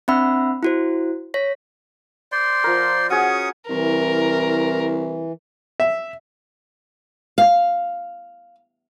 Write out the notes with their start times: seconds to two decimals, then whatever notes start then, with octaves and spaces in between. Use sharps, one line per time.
0.08 C4 D4 E5 F#5 B5 E6
0.63 E4 F#4 C5
1.34 C#5 A#6 B6
2.32 C5 D5 C6
2.64 F3 A#4
3.10 C#4 F#4 G#4 C#6 D#6
3.69 C2 E3 A#4
5.80 E5
7.38 F5